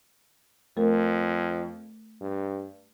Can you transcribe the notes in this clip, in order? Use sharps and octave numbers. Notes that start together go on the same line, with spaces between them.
F2 A3 A#4
G2